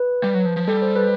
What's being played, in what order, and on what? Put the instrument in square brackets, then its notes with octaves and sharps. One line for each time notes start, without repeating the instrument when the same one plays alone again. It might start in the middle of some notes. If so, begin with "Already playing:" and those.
Already playing: [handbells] B4
[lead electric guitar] G3
F#3
F3
F3
[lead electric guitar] G3 [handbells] A4
[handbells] C5
B4